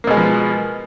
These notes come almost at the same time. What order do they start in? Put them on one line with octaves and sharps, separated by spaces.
A#3 B2 G#3 B3 F3